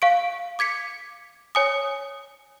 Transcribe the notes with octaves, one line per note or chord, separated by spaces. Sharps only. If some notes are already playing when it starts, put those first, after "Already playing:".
F5 C#6 D7
D6 G#6 B6 C#7
C#5 G#5 D#6